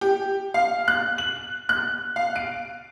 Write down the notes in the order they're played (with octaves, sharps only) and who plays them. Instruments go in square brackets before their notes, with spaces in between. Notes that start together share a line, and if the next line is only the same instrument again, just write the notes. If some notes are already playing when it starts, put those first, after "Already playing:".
[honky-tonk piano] G4
F5
F#6
F#7
F#6
F5
D7